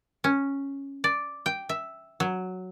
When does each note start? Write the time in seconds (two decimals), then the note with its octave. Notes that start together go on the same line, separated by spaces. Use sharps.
0.24 C#4
1.04 D5
1.46 G5
1.69 E5
2.20 F#3